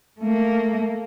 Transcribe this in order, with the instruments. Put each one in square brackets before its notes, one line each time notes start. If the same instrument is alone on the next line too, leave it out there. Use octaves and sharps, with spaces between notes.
[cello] A3 A#3